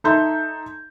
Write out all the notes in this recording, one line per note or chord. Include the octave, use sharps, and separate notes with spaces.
D#4 A4 E5 C6 G6